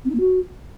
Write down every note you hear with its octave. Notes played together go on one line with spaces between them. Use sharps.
C4
D#4
A#3
F#4